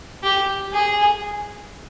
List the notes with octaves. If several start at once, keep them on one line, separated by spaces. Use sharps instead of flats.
G4
G#4